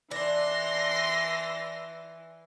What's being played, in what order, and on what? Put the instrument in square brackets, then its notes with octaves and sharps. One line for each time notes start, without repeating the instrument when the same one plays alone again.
[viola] E3 [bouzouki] D4 [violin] C6 A#6